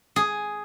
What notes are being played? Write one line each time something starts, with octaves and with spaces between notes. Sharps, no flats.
G#4